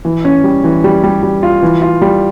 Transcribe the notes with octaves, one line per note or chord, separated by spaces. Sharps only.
E3
C#4
G3
E3
G3
G3
G3
F4
E3
F4
G3